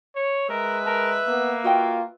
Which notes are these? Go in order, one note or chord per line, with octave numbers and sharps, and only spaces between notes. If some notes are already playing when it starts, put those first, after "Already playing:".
C#5
G#3 A#4 B4 E5
A#4 A5
A#3 B3
F4 F#4 D#5 G5